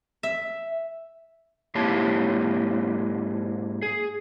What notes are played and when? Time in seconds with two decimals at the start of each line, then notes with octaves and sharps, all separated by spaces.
0.23 E5
1.75 G#2 A#3 E4 G4 C#5 A5
3.82 G#4